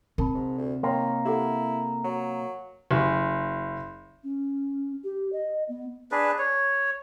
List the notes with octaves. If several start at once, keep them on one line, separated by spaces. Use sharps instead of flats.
C3 A#4 A5 B5
G#2
D2
D#3 A#3 C#5 G5 C6
E4 G4 A4 F#5
F#3
F#1
C#4
G4
D#5
B3
D4 G#4 B4
C#5